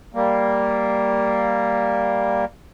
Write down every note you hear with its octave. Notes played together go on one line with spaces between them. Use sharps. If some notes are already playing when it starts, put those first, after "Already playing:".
G3 A#3